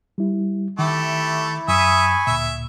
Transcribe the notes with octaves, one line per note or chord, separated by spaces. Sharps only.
G3 E4
D#3 A3 E4 G4
F#2 E5 G#5 B5 C#6 D#6
D2 A#2 E5